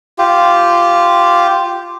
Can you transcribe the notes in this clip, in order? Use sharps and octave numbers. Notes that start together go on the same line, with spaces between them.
F4 G4